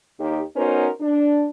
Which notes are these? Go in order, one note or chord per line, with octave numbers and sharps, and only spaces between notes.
D#2 D#3 D#4 G4
B3 C#4 D#4 F#4 A#4 C5
D4